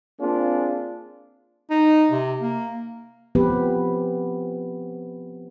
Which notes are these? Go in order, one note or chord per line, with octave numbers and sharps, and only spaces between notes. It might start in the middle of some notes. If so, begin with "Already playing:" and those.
A#3 C4 D4 F4 G#4
D#4
C3
A#3
F3 B3 C4 G4 B4